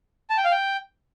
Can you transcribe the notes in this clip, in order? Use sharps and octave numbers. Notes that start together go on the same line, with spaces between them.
A5
G5
F5
G5